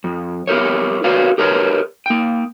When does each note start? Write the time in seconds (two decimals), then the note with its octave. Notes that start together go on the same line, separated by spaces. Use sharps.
0.04 F2
0.47 E4 G4 A#4 C#5
1.04 F#4 A#4 B4 C#5 D5 F5
1.38 G4 A#4 B4 C#5 A5
2.06 A#3 G5